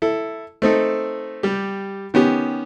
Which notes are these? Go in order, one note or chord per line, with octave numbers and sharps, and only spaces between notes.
E4 A4
A3 C4 D#4 A4
G3 G4
D#3 B3 C#4 G4